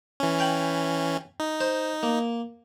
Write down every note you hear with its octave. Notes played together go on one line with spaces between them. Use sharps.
E3 C#4
F5 G5 B5
D#4
C5
A#3